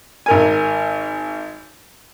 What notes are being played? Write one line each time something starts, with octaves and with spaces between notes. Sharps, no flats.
G#1 A#4 G#5